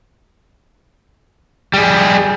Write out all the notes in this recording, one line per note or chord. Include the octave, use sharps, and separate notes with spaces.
G3 G#4